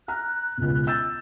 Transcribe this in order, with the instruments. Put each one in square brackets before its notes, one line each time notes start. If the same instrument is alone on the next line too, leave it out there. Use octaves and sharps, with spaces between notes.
[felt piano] A#5 F6 [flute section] F#6
[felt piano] E1 C#2
E6 G6 A6